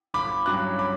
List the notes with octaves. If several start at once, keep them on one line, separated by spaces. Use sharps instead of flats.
G1 B5 D6
G2 F#3 C#4 D6 F#6
B5 D6